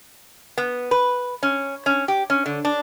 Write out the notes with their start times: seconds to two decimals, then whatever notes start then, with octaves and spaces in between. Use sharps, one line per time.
0.58 B3
0.91 B4
1.43 C#4
1.86 C#4
2.08 G4
2.30 C#4
2.46 D3
2.65 D4